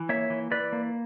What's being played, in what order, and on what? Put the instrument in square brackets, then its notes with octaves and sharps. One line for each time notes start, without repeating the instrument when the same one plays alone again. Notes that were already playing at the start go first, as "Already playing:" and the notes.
Already playing: [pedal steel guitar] E3
A#3 C#5 E5
E3
E3 B4 D5
A#3